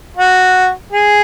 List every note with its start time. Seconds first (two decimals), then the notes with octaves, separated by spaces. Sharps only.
0.17 F#4
0.92 G#4